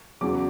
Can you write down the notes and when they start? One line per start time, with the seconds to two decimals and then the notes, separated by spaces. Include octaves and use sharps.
0.21 E2 C#3 F#3 D6